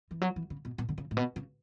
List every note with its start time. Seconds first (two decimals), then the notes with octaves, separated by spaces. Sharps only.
0.11 E3
0.22 F#3
0.36 E3
0.50 C#3
0.65 B2
0.78 B2
0.89 D3
0.98 C#3
1.11 A2
1.17 B2
1.36 C#3